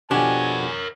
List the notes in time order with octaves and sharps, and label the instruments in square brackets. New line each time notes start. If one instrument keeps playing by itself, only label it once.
[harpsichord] F2 B2 [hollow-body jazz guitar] D4 G4 [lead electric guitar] A#4 C#5 [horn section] G#5